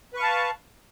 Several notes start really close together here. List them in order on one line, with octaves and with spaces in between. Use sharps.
B4 C#6 F5 A5